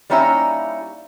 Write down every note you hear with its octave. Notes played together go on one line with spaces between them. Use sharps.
G3 A#3 C#4 D#4 E4 E5